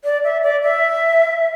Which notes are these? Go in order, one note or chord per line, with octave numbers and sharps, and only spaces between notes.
D5
E5
D5
E5